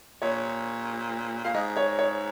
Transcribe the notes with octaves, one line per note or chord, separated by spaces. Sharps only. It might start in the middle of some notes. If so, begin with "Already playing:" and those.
A#2 C#5
A#2 F5
G#2 D#5
C#5
C#5